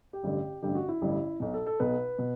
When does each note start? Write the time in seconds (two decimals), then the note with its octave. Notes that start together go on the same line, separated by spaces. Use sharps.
0.13 G4
0.23 A1 G2 D3
0.62 A1 G2 D3 G4
0.75 F#4
0.89 E4
1.02 A1 G2 D3
1.40 B1 B2
1.54 A4
1.66 A4
1.80 B1 B2 B4
2.18 B2